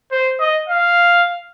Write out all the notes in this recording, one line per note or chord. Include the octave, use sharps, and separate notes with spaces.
C5
D#5
F5